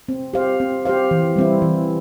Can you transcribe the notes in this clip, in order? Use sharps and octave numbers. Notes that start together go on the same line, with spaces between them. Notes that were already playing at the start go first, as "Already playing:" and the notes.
C4
G4 C5 F5
C4
G4 C5 F5
E3
G3 C4 E4
E3